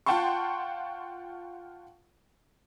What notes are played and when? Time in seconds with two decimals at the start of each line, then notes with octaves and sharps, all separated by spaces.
0.06 F4 F#5 G5 A5 C6 C#6